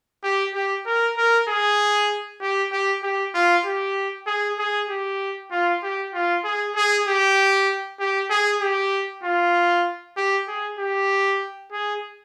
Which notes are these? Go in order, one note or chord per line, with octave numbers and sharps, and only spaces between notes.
G4
G4
A#4
A#4
G#4
G4
G4
G4
F4
G4
G#4
G#4
G4
F4
G4
F4
G#4
G#4
G4
G4
G#4
G4
F4
G4
G#4
G4
G#4